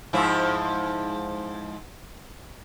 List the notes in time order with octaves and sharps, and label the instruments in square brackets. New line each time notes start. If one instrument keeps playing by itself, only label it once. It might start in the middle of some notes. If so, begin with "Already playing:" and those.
[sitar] G#2 F3 E4